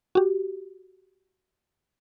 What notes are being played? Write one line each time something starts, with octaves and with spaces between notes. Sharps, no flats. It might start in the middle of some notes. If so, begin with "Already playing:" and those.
F#4 G4